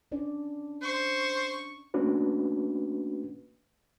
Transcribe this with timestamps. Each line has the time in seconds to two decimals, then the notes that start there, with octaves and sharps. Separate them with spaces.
0.12 C#4 D4 D5
0.82 C5 C#6
1.94 A3 A#3 C#4 D4 F#4 B4